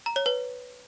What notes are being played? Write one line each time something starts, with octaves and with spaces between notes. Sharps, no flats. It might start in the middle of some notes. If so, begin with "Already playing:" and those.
A#5
C#5
B4